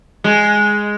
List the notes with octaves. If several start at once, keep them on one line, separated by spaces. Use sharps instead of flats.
G#3